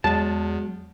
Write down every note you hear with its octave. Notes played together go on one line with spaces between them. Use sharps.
E2 F#3 G#3 A5